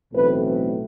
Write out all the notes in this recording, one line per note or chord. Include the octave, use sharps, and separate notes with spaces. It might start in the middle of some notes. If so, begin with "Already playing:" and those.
B1 A2 E3 A3 C4 B4